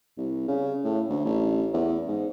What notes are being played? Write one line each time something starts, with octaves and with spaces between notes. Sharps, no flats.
C2
C#3
A2
D2
A1
E2
G#2